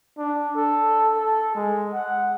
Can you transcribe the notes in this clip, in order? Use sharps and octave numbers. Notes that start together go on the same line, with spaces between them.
D4
A4
A4
G#3
F#5